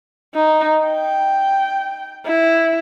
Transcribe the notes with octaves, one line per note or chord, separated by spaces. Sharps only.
D#4
G5
E4